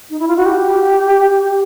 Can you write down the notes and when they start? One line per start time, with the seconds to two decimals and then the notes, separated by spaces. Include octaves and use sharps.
0.10 D#4
0.19 E4
0.28 F4
0.37 F#4
0.46 G4